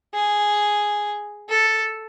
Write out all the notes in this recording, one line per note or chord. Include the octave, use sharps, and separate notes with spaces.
G#4
A4